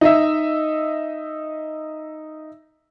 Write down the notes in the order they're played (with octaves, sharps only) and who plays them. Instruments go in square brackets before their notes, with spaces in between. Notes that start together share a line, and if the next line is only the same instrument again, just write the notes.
[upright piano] D#4 D#5 E5